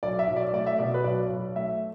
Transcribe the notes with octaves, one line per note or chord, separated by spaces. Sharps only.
B1 D5
E5
B1
D5
A3 D5
E5
B2 D5
B4
B1 D5
B1
A3 E5